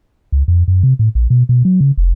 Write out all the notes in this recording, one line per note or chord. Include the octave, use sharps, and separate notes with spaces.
C#2
F2
F#2
C3
A2
A#1
B2
B2
F#3
C#3
F1